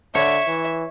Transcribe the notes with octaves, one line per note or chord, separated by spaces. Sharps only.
D3 C#5 E5
E3